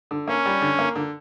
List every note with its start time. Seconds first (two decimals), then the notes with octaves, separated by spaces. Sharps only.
0.11 D3
0.28 A#3 C#4
0.46 G3
0.62 D3
0.79 A#3
0.96 D3